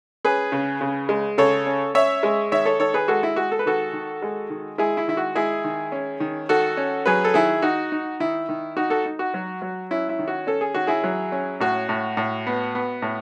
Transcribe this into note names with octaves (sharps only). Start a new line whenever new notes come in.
C#4 G#4 B4
C#3
C#3
G#3
C#3 A4 C#5
C#4
C#4 C#5 E5
G#3
D#3 C#5 E5
A4 C#5
D#3 A4 C#5
G#4 B4
G#3 F#4 A4
E4
G#3 F#4
A4
B4
D#3 F#4 A4
D#3
G#3
D#3
G#3 E4 G#4
E4
D#3 E4
F#4
G#3 E4 G#4
D#3
C#4
D#3
D#3 F#4 A4
C#4
F#3 G#4 B4
A4
D#3 E4 G#4
D#4 F#4
D#4
D#3 E4
D#3
D#4 F#4
F#4 A4
D#4
F#4
F#3
F#3
C#4 E4
E4
D#3
F#4
C#4 A4
G#4
D#3 F#4
E4 G#4
F#3
C#4
A2 F#4
A2
A2
B3
B3
A2